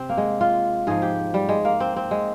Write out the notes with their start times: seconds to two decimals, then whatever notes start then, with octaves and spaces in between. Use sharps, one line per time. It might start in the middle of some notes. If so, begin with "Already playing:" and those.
Already playing: C3 C4
0.09 A#3
0.17 G#3
0.41 F4
0.87 G#2 F3 G#4
1.02 G4
1.34 G3
1.49 G#3
1.65 A#3
1.80 C4
1.96 C4
2.11 G#3